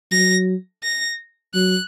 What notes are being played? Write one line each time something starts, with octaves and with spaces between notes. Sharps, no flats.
F#3 A#6
A#6
F#3 F#6